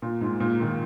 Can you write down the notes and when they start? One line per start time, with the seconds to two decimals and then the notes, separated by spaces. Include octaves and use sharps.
0.02 A#2
0.21 G#2
0.40 A#2
0.60 A#2 D#3